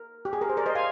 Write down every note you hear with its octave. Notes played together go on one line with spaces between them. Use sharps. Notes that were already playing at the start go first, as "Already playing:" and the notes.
Already playing: A#4
G4
G#4
A#4
C5
A#4 D5
C5 D#5
F5 G#5